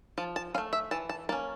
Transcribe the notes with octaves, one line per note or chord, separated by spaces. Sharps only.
F3 A5
A5
C#4 F5
A3
E5
E3 A5
A5
A#3 C#4 A5